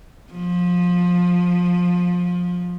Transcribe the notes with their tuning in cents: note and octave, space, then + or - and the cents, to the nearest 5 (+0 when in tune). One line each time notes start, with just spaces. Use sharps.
F3 +20